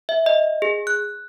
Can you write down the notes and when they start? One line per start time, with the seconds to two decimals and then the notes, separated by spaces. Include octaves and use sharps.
0.09 E5
0.26 D#5
0.62 G#4
0.87 F#6